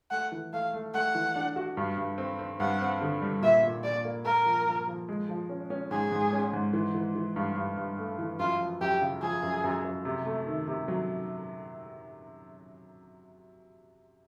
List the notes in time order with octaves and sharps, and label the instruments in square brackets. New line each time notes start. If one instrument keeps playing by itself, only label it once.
[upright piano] A3 [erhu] F#5
[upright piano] E3
[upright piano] A3 [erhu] F5
[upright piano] A3
[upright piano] A3 [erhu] F#5
[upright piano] E3
D4
F#4
G2
G2
C4
C4
[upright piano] G2 [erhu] F#5
[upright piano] C4
D3
G3
[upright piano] A#2 [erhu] E5
[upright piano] A#2
[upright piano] A#2 [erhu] D5
[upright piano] A#3
[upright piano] A#3 [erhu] A#4
[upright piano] F3
F3
F3
G#3
F3
C#4
C#4
[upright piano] G#2 [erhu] G#4
[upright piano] G#2
C#4
G#2
E3
E3
E3
G2
G2
G2
A3
E3
[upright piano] F#2 [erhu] F4
[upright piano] F3
[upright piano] F#2 [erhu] G4
[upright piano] C#3
[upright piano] F3 [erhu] G#4
[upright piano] F#2
F#2
F#2
C3
A3
D#3
C3
F#3